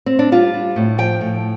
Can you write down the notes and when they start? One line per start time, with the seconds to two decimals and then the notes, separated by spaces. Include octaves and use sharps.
0.06 C4
0.19 D4
0.32 G3 F4
0.54 G3
0.76 A2
0.98 F3 G5
1.21 A2